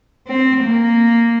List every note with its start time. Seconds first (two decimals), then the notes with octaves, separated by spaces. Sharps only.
0.27 C4
0.64 A#3